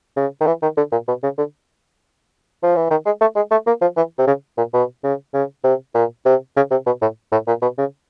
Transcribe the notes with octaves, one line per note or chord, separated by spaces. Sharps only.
C#3
D#3
E3
D#3
D3
A#2
B2
C#3
D3
F3
E3
D#3
G#3
A3
G#3
A3
A#3
F3
E3
C3
C#3
A#2
B2
C#3
C#3
C3
A#2
C3
C#3
C3
B2
A2
A2
A#2
B2
C#3